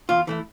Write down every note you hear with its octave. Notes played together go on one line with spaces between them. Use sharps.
E2 F4
E3 A3 E4